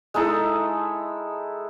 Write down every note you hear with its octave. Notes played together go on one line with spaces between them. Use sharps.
G#3 D#4 E4 A4